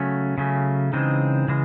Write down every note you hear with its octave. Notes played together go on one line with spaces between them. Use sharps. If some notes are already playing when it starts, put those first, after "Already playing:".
Already playing: C#3 F#3 A3 C#4
C#3 F#3 A3 C#4
C#3 E3 G#3 C4 D#4
C#3 E3 G#3